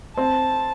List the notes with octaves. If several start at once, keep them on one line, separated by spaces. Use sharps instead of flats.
C4 A5